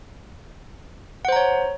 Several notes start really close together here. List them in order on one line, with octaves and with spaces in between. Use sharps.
F#5 C5 A#5 C#5